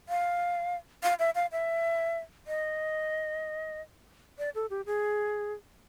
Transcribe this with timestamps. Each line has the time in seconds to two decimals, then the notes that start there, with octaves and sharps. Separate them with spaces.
0.09 F5
1.03 F5
1.19 E5
1.35 F5
1.52 E5
2.47 D#5
4.38 D5
4.55 A4
4.70 G4
4.86 G#4